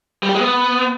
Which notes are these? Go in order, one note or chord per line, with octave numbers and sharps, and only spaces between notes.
G3
G4
G#3
B3